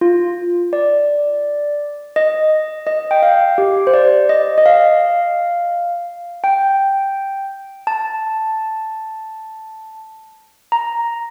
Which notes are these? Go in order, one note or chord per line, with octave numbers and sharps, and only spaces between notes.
F4
D5
D#5
D#5
G5
F5
G4
C5
D5
D#5
D#5
F5
G5
A5
A#5